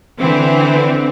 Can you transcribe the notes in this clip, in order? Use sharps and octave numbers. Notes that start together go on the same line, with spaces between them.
D3 E3 C4